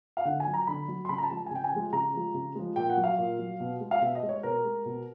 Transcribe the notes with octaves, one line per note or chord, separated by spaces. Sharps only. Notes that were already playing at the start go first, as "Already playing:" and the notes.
F5
D3 F#5
G#5
F#3
A#5
D3 B5
F#3
C6
C#3 B5
A#5
A5
F3 G#3
A5
G#5
C#3 G5
G#5
F3 G#3
C#3 A#5
F3 G#3
C#3
F3 G#3
A#2 G5
F#5
F#3
F5
A#2
F#3
B2
G#3
F5
B2 E5
D#5
G#3
C#5
B2 A#4
G#3
B2